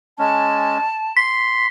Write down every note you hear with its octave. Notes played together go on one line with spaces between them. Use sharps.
G#3 C#4 A5
C6 B6